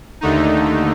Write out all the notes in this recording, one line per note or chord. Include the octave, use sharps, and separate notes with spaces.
D#2 D3 A3 D#4